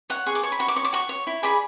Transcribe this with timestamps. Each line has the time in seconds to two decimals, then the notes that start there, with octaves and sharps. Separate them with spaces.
0.10 C#5 F#5
0.26 G#4 C#6
0.35 D6
0.43 C#5 C#6
0.52 B5
0.59 F#4 C#6
0.68 D6
0.76 C#5 C#6
0.84 D6
0.93 F#4 C#6
1.09 C#5
1.27 E4
1.43 G#4 D5 B5